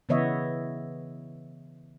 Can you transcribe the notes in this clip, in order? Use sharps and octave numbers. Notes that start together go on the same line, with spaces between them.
C#3 E3 B3 C#5 D#5 E5